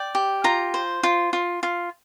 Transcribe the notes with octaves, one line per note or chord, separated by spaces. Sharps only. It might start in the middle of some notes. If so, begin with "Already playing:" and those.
Already playing: D5 G5
G4
F4 A#5
C5
F4
F4
F4